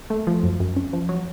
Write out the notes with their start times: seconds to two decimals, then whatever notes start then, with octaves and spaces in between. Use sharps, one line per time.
0.10 A3
0.27 F3
0.43 F#2
0.60 F#2
0.76 C#4
0.93 F3
1.09 F#3